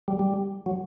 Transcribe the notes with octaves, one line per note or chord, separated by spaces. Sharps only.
G3
G3
F#3